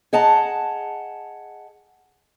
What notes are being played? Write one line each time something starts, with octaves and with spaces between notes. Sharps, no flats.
G#4 D#5 F#5 A5 A#5